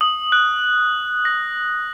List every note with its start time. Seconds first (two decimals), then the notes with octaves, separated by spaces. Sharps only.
0.01 D#6
0.32 F#6
1.25 A#6